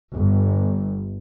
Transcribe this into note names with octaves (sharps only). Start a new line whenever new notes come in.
G1